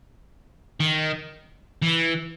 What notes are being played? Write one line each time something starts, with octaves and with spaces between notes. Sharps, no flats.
D#3
E3